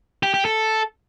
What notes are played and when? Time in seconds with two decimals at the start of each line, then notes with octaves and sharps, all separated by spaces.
0.23 G4
0.34 G4
0.45 A4